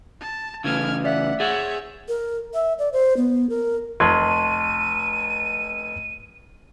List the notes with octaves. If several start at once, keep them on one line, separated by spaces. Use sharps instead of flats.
A5
C#3 E3 A3 F6 G#6
D5 E5 F#5 B6
G#4 C#5 E5 F#5 A6
A#4
E5
D5
C5
B3
A#4
F1 A5 C6 C#6 G#6 D#7